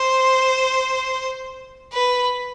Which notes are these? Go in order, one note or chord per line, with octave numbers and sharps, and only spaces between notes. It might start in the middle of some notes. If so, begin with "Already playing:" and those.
Already playing: C5
B4